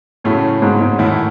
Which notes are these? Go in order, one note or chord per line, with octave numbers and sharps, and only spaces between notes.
F#2 A2 C#3 F#3 A3 C#4
G#2
G#2
E2 A2 D#3 A3 E4